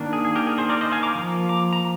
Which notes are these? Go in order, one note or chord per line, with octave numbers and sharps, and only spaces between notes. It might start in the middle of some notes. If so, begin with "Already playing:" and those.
Already playing: D#3 A#3 D4
G#4
G#4
G4 A#4
G#4
G#4 C5
A#4 D5
C5 D#5
F5 G#5
A#5 D6
F3 A#3
A#5 D6
A#5